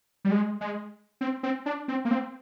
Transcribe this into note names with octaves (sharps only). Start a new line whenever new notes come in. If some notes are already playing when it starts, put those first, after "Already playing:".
G3
G#3
G#3
C4
C4
D4
C4
A#3
C4